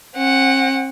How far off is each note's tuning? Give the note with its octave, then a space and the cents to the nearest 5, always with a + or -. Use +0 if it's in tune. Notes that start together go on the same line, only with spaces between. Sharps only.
C4 +45 F#5 +0